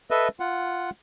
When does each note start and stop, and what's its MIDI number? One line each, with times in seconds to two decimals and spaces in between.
0.11 0.28 69
0.11 0.28 71
0.11 0.28 75
0.11 0.28 76
0.40 0.90 65
0.40 0.90 78